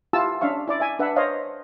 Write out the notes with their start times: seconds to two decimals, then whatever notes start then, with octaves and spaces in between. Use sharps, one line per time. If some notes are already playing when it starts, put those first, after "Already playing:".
0.13 E4 F4 G4 A5 E6
0.41 C#4 D4 E5 F5 C#6
0.68 E4 D5 D6
0.80 E5 G#5
0.99 D4 B4 E5 F#5
1.16 C5 C#5 D#5 F5